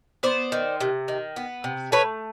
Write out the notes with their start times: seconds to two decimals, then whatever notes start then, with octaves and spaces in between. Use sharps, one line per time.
0.23 B3 C5 D5
0.52 D#3
0.81 C3
1.08 D#3
1.36 B3
1.64 C3
1.92 A3 B4 C#5